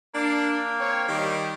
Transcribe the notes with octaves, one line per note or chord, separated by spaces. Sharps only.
A#3 D4
C4 C#5
D#3 G3